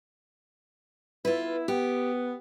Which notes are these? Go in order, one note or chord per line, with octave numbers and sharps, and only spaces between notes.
B3 E4 F4 B4
B3 G4